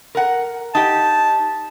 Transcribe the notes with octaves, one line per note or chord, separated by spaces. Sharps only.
A#4 F#5
D#4 G4 A5